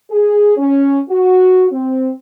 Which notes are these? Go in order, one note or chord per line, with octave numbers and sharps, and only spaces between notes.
G#4
C#4
F#4
C4